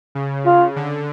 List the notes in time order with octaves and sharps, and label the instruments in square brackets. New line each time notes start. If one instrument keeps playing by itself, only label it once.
[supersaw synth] C#3
[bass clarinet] F4
[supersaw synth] D3